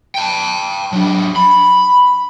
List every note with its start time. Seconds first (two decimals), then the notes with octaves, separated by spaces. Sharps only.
0.15 G5 A5
0.93 F#3 D4
1.36 B5